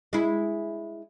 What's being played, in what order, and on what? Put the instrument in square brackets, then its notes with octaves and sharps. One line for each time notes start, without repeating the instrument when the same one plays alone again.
[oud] G#3 E4